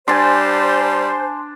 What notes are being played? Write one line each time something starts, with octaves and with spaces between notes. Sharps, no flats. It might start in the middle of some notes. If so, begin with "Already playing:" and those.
G3 D4 C5 G#5 A5 C6